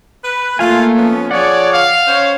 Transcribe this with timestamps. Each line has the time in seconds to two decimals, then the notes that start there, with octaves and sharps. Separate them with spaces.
0.24 B4
0.59 A3 A#3 F4 F5 G#5
0.97 F3 B3 C#4
1.31 F3 G#4 C#5 D5 F#5
1.73 F5
2.07 C#4 C5 C#5